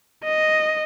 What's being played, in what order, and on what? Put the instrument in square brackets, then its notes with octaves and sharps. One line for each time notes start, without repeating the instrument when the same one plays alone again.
[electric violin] D#5